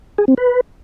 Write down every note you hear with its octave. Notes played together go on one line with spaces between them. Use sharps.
G#4
C4
B4